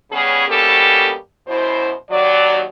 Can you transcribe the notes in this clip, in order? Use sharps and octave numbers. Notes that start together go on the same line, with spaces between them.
C#3 G3 B3 C#4 G#4 C#5
B2 G3 A#3 C#4 G4 A4
F#2 B2 E4 C5
D#2 F#3 D5